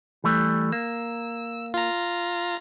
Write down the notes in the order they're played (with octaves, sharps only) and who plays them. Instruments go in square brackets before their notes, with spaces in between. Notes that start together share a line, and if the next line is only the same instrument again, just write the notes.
[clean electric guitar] E3 G3 A3
[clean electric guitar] A#3 [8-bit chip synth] E6
[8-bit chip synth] F4 A#5